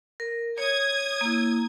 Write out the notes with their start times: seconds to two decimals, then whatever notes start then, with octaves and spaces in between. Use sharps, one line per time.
0.20 A#4
0.58 C#5 D#6 G#6
1.21 A#3 E4